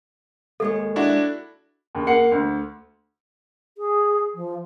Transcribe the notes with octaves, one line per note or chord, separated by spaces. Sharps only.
D#2 G#3 A4 C#5
D4 E4 F#4
D#2 C#3
A#3 F#5 C7 C#7
D2
G#4
F3